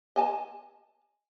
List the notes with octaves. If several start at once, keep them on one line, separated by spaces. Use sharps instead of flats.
D#5 G#5 A5